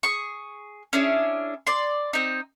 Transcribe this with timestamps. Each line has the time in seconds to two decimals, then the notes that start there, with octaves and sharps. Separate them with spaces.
0.03 G#4 C#6
0.93 C#4 D4 E4 G#4
1.67 D5 C6
2.13 C4 D#4